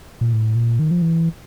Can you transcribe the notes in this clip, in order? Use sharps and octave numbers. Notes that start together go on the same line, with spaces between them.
A#2
A2
A#2
D#3
F3
E3